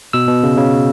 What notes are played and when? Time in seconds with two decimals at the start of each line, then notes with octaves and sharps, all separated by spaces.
0.13 B2 E6
0.28 B2
0.43 C#3
0.57 C#3